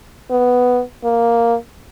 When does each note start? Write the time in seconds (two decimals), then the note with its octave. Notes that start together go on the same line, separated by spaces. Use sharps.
0.31 B3
1.04 A#3